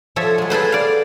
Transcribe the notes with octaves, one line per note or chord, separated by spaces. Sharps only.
F3 A4 C#5 E5
F#3 G#3
G#4 A4 B4 C5
D5 F5